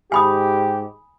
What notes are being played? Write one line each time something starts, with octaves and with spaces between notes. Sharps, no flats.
G#2 G4 G#5 B5 D#6